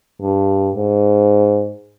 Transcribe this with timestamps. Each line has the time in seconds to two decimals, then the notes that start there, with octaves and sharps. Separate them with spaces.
0.21 G2
0.75 G#2